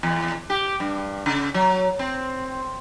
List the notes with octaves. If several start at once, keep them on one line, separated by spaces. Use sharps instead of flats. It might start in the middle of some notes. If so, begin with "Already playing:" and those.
E2
G4
G2
C#3
F#3
C4